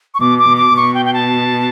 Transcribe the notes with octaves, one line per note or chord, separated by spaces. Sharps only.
C#6
B2 D6
D6
B2
D6
B2 C#6
G5
G5
A5